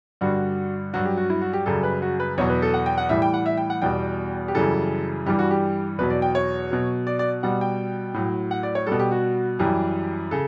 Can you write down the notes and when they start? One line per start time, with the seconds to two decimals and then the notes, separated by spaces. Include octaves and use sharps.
0.21 G2 D3 G3 F#4
0.93 G2 F#3 F#4
1.05 G4
1.17 F#4
1.30 E4
1.41 F#4
1.53 G4
1.66 F#2 C#3 G3 A4
1.83 B4
2.02 F#4
2.20 B4
2.38 E2 B2 F#3 C#5
2.50 B4
2.62 A4
2.74 F#5
2.86 G5
2.98 F#5
3.09 A2 E3 G3 E5
3.22 G5
3.34 F#5
3.46 E5
3.57 G5
3.70 F#5
3.82 E2 B2 G3 G5
4.48 G4
4.54 F#2 C#3 E3 G3 A4
5.26 G2 E3 G3 G4
5.39 F#4
5.51 G4
5.98 E2 B2 F#3 B4
6.10 D5
6.22 G5
6.35 C#5
6.71 B2 F#3
7.07 D5
7.19 D5
7.43 B2 G3 F#5
7.61 G5
8.14 A2 F#3
8.51 F#5
8.63 D5
8.75 C#5
8.86 B2 G3 A4
8.99 G4
9.11 F#4
9.59 F#2 E3 G3 G4
10.31 C#3 A4